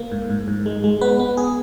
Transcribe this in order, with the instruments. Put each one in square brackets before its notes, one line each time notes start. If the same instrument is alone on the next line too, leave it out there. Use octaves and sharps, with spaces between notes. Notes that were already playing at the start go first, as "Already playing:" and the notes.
Already playing: [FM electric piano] A#3
G#2
G#2
G#2
G#3
G#3
B3 B4
B3
G#4